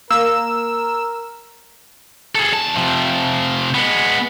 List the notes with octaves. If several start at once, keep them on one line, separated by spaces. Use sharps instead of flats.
A#3 A#4 E6
G#4 A4
E2 A5
C3 F3
G#3 B3